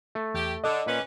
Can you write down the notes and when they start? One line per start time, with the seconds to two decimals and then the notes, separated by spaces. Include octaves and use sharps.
0.15 A3
0.34 E2 G4
0.64 D3 D4 D#5 D6
0.86 A#2 C#4 B4